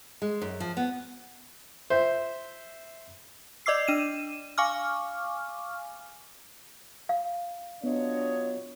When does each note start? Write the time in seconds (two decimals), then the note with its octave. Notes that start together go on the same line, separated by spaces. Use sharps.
0.22 G#3
0.42 F#2
0.60 F3
0.77 B3
1.90 C5 E5
3.66 D5 D#5 D6 E6 C7
3.87 D4 D#7 E7
4.58 F5 G#5 C#6 D6 F6
7.09 F5
7.84 F#3 B3 D4 F4 C#5 D#5